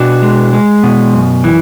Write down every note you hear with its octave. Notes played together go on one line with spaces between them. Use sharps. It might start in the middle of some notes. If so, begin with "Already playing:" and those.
Already playing: B2 D4 F#4
G#3
G#3
B2
F#2
E3